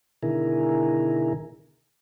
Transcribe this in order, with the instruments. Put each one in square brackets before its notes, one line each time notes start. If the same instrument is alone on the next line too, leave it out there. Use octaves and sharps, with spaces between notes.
[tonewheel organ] B2 D3 D#3 E4 G#4 A#4